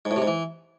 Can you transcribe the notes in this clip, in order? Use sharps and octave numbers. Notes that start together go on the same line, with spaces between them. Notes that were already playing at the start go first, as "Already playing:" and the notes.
G#2
A2
C3
G#2
E3